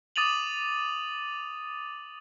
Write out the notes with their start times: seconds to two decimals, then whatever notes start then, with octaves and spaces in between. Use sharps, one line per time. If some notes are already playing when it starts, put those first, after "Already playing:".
0.16 D6 D#6 A6 D#7 F7 F#7